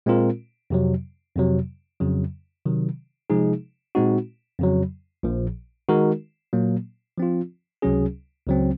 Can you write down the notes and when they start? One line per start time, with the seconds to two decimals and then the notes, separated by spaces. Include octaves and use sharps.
0.06 A#2 G#3 C4 F4 A#4
0.70 F2 C3 F#3
1.35 F2 C3 F#3
2.01 F2 C#3 F#3
2.66 C3 D#3 F#3
3.30 C3 F3 G#3 D#4 G#4
3.95 A#2 G#3 C4 D#4 F#4
4.59 F2 C#3 F#3
5.23 A#1 A#2 F3
5.89 D#3 G#3 D#4 F#4 A#4
6.53 A#2 F#3 A#3
7.18 F3 C4 F4
7.82 C#2 C3 F#3 C#4 G#4
8.47 C#2 C#3 F#3 C4